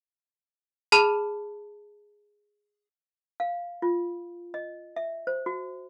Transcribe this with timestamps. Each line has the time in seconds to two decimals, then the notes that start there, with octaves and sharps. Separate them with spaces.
0.92 G#4 A5 B5 F6 D#7 F7
3.40 F5
3.82 F4
4.54 D#5
4.96 E5
5.27 C5
5.46 F#4